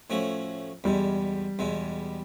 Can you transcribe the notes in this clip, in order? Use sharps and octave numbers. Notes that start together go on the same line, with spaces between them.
A2 F3 A3 C#4 F#4
E2 B2 G3 G#3
E2 B2 G#3